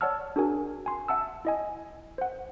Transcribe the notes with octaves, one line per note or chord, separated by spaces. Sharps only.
C#5 D5 F#5 A5 E6 F6
D4 F#4 G#4 A#4 G#5
G#5 C6
E5 F#5 A5 E6
E4 D#5 G#5
C5 F#5